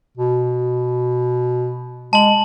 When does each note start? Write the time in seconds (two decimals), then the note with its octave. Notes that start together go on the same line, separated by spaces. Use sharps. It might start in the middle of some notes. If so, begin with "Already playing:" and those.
0.17 B2
2.13 G#3 A5 F#7